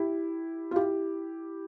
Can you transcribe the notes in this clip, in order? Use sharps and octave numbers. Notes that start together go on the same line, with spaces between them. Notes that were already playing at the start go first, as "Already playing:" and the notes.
Already playing: E4 G4
F4
E4 G4